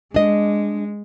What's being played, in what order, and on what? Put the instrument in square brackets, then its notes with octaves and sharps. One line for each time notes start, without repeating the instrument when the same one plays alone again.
[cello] G#3 [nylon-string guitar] D4 D#5